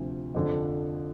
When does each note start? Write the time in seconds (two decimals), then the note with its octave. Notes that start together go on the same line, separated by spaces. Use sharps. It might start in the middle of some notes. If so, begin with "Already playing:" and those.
Already playing: D2 C3 F3
0.34 F2 D3 F3